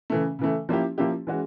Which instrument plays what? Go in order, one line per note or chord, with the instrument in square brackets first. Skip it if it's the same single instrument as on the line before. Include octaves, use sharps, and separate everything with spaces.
[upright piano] C#3 E3 A3
C#3 E3 A3
F3 A#3 C#4 E4 G4
F3 A#3 C#4 E4 G4
E3 G#3 C#4 F#4